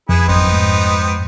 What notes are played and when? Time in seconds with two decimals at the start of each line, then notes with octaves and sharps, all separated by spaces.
0.09 F2 B3 E4 G#4
0.28 G#1 F#2 B3 C4 D#4
0.51 G#2